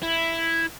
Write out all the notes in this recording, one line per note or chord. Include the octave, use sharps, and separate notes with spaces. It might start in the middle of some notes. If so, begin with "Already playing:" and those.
E4